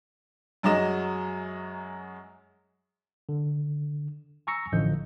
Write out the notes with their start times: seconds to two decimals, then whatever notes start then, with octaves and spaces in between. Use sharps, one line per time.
0.63 F#2 F#3 G#3 D#5 E7
3.29 D3
4.47 G#5 A#5 C#6 E6 A#6 C#7
4.72 A1 D3 F3 D#5 G6